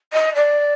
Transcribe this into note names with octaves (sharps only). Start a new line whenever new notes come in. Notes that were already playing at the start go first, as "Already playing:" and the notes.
D#5
D5